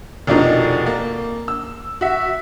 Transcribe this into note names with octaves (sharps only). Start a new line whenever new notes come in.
F1 B2 F3 D4 D#4 A#4
A#3
E6
F#4 E5